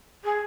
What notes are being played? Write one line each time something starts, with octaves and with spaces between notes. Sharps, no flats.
G#4